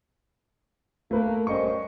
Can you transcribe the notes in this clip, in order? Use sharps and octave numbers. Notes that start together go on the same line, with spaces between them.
A3 A#3 B4
G3 C#4 C5 D#5 C#6